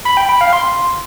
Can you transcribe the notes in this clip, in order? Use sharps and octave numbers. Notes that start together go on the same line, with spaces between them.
B5
G5
B5
F5
C6